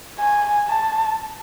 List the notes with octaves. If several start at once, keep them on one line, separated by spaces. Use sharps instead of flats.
G#5
A5